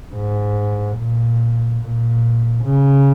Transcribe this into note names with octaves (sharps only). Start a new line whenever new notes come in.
G#2
A#2
A#2
C#3